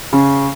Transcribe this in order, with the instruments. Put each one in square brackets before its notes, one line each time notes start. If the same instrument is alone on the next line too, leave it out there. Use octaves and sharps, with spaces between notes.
[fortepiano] C#3